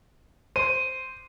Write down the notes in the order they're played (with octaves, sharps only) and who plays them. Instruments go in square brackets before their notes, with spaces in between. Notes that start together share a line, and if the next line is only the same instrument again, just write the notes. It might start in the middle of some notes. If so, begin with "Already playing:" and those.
[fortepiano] C5 [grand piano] D#7